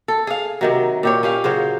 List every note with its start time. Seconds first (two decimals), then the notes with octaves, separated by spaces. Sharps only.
0.08 A4
0.27 G#4 F5
0.61 C3 D#3 F#3
1.03 A#2 G4 C#5
1.23 C#4 G4 F5
1.44 C#3 F#3 C5